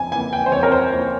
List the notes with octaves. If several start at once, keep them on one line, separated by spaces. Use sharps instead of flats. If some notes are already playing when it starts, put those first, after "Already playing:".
Already playing: F2 G#5
E3 A#3 G#5
G5
C5
F2 C#5
A#4
C5
E3 A#3 C5